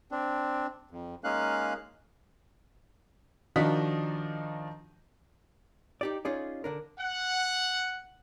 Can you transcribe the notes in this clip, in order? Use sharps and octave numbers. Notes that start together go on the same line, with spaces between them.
C4 D4
F2
G#3 A#3 C#4 D#4 F5 F#6
D#3 F3 D4 F#4 D#5 B6
D#4 G4 D5
C#4 D#4 F4 G#4 D5
D3 D4 A#4
F#5